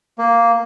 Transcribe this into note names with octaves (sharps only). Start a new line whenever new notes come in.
A#3